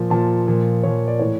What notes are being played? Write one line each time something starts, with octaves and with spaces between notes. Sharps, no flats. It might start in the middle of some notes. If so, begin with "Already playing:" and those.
Already playing: A#2 F3
A#2 F3 A5
A#2 F3
A#2 F3 C#5
D5
A2 E3 C#5